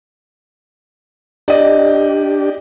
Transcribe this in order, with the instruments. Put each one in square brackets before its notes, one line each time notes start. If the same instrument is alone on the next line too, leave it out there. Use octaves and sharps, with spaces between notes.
[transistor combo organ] D4 G4 [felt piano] D5 D#5